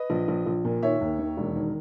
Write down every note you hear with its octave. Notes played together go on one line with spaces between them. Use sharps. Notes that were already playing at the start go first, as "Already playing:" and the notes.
Already playing: B4 D#5
A#1
A#1
A#1
A#2
D#3 C#5 E5
D#2
D#3
E1
D#3